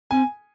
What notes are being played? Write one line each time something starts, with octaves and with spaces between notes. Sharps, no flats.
C4 G#5